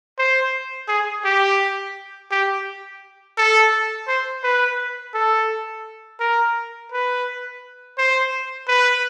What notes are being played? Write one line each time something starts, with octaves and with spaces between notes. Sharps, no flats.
C5
G#4
G4
G4
A4
C5
B4
A4
A#4
B4
C5
B4